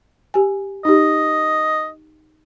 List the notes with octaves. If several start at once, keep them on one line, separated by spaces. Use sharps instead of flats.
G4 G#5
D#4 G4 D#5